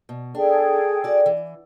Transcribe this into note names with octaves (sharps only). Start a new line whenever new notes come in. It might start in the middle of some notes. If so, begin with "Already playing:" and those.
B2
D4 G#4 A4 G5
F#4 D5
E3